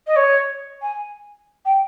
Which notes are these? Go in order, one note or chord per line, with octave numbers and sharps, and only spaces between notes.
D#5
C#5
G#5
G5